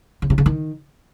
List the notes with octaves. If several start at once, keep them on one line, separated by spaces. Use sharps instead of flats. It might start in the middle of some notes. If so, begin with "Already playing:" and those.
C#3
C3
C#3
D#3